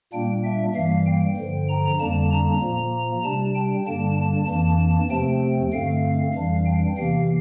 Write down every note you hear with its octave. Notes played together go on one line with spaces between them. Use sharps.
A#2 G3 A#3 D4 G5
E5
G2 E3 G3 A#3 F5
G5
G2 D3 F3
A#5
F2 D3 G3 A#3 D4 A5
A#5
A#2 F3 A#3
C3 G3 D4 A5
G5
G2 D3 G3 A#3 D4 A5
A5
F2 E3 A#3 D4 A5
E2 C3 F3 A3 C4 G5
G2 D3 A3 C4 F5
F2 E3 G3 D4
G5
E2 C3 E3 A#3 F5